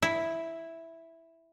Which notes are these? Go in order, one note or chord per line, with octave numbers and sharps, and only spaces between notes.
E4